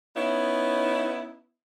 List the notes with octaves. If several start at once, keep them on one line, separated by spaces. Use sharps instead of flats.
B3 C#4 D#4 E4